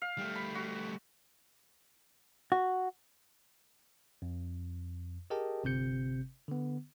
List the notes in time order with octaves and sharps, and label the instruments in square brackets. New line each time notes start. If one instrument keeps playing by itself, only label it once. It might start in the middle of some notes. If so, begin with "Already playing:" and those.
[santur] F5
[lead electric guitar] G3 A3
[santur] B5
F#4
[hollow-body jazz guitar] F#4
[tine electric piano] F2
G4 G#4 A#4 D#5 G5 A5
G1 C3 C4 G6 C#7
D3 B3